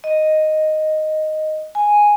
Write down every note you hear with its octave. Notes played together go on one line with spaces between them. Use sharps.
D#5
G#5